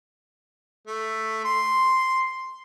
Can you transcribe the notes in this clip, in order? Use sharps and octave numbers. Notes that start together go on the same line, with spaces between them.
A3
C6